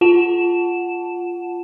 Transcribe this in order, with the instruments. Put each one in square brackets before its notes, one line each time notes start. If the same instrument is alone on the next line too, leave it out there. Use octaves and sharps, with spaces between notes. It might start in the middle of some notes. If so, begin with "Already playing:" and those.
[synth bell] F4 F#5 A5 E7